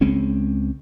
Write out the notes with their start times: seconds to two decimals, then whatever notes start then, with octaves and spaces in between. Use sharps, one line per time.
0.01 C#2 G#3 C4 C#4